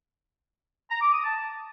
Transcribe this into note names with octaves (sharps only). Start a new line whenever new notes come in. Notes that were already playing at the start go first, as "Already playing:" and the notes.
A#5
D6
D#6
A5